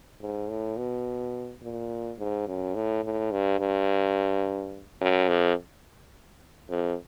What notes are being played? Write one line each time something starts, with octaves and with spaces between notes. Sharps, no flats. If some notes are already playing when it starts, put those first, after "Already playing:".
G#2
A2
B2
A#2
G#2
F#2
A2
A2
G2
G2
F#2
F2
F2